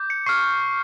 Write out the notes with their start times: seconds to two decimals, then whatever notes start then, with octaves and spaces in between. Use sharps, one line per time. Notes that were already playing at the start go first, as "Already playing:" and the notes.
Already playing: D6 G6
0.10 C#7
0.26 C#6 F6 C7